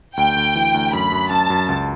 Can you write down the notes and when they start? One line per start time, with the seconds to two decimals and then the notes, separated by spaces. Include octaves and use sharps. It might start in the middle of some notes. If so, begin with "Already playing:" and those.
0.17 D2 G5
0.36 D2
0.55 E3
0.74 D2
0.93 F#2 B5
1.12 F#2
1.31 F#2 A5
1.50 F#2
1.69 C#2